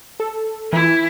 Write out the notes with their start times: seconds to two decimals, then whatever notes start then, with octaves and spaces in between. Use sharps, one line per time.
0.20 A4
0.73 E3 E4